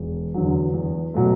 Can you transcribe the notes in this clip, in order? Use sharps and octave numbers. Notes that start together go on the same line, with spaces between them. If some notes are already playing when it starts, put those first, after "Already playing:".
Already playing: E1
E2 D3 F#3
E2
B2 F#3 A3